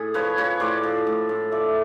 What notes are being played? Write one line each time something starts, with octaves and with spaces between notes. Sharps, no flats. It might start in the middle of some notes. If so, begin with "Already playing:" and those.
Already playing: A2 G#4
F3 B4 C#5
F3 B4 C#5
A2 C5 D5
F3
A2
A2
F3 D5 E5